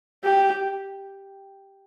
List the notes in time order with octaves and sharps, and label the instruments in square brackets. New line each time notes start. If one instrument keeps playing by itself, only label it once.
[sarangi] G4